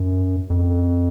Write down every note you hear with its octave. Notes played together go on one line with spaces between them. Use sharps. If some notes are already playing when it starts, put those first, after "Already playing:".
Already playing: F#2
F2